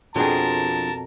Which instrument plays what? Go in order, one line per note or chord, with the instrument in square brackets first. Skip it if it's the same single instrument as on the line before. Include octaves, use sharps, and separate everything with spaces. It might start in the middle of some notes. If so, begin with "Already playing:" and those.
[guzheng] F2 B2 [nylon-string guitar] F3 D4 G#4 [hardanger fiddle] A#4 [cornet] A5